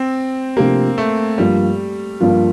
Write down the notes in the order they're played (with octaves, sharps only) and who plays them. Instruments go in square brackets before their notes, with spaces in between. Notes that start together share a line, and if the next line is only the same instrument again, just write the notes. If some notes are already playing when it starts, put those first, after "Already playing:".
Already playing: [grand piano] C4
[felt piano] C3 F3 A3 D4 G4 [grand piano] A#3
[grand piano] A3
[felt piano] G2 F3 A#3 F4 [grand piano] G3
[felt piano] G2 F3 A#3 F4